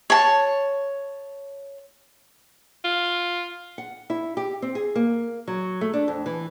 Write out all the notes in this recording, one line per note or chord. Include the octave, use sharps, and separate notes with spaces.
C#5 A5
F4
F#5
E4
G4
C4
G#4
A#3
F#3
A3
D4
F2
E3